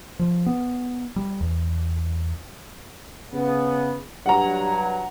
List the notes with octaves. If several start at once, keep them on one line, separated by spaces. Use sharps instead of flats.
F3
B3
G3
E2
C#3 B3
G2 F#3 F#5 A#5